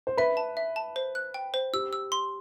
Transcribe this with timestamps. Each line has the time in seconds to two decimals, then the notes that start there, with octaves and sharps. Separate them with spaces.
0.07 C5
0.17 B4 E5
0.37 A5
0.57 E5
0.76 A5
0.96 C5
1.15 F#6
1.34 G5
1.54 C5
1.73 G4 E6
1.93 E6
2.12 C6